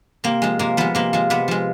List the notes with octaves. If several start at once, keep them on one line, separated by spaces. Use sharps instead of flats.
C3 A#3
F3 G#3
C3 A#3
F3 G#3 B3
C3 A#3
F3 G#3
C3 B3
F3 G#3